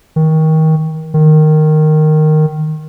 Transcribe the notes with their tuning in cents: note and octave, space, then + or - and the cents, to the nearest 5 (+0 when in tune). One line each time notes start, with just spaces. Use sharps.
D#3 +25
D#3 -10